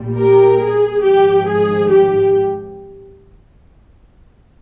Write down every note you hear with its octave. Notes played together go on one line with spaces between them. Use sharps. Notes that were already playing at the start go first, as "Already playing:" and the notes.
Already playing: A#1 A#2 G3
G4 A#4
G#4
G#1 G#2 F3 G4
G#4
G4